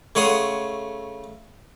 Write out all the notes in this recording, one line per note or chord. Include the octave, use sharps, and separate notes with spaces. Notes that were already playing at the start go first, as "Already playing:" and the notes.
C#3 A3 C#5 F#5 C6 D#6